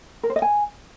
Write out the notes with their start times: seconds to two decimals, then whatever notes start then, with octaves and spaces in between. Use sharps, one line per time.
0.23 A#4
0.30 C5
0.36 D#5
0.42 G#5